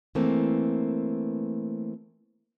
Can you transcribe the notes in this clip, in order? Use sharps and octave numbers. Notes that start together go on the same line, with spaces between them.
E3 A3 A#3 C4